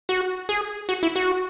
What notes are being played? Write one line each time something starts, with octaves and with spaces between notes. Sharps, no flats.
F#4
G#4
F#4
E4
F#4